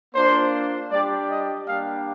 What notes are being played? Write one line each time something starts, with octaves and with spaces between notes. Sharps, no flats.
A#3 D4 F4 C5
G3 D4 G4 D5
D#5
G3 A#3 D4 G4 F5